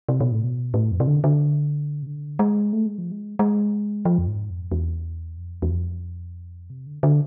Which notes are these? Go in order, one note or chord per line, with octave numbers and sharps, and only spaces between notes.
C3
B2
A2
B2
A2
F2
C3
D3
D3
C3
D3
G#3
A3
G#3
F3
G#3
G#3
F3
F2
G#2
F2
E2
F2
E2
F2
C3
D3
D3